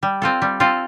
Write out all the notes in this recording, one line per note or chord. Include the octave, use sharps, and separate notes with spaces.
G3
C4 F4 A4
G3
C4 F4 A4